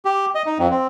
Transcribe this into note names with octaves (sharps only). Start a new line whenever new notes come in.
G4
D#5
D#4
F2
C4